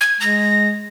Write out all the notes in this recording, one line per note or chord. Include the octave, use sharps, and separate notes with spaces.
G#6
G#3 A#6